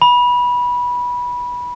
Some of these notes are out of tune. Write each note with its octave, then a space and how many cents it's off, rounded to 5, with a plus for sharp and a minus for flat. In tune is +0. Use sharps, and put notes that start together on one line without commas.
B5 -20